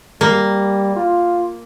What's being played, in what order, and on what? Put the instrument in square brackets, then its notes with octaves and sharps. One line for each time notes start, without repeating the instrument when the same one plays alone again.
[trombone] G3 [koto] A#3
[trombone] F4